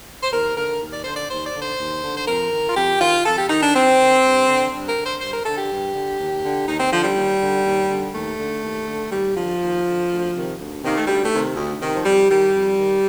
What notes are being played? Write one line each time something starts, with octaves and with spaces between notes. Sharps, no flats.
C5
D#2 A#4
D3 A#4
D#2
D5
D3 C5
D5
D#2 C5
D5
D3
C5
D#2
D3
C5
F2 A#4
D#3
F4
F2 G4
D#3 F4
F2 A4
G4
D#3 D#4
D4
F2 C4
D#3
G2
D3
G2 D4
A#4
D3
C5
G2 C5
A#4
D3 A4
G4
G2
D3
D#2
D3
D#2 D#4
C4
D3 F3
G3
D#2
D3
D#2
D3
D#2 A3
D3
D#2
D3
D#2 G3
D3 F3
D#2
D3
D2
C3 D#3
D2
C3 D#3 A#3
A3
D2 G3
A3
C3 D#3
D2
C3 D#3
F3
F2 G3
D#3 G3
F2
D#3